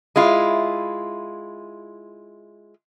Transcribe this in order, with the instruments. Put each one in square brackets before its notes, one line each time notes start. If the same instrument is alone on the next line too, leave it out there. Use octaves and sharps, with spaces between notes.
[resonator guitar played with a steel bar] G#3 E4 F4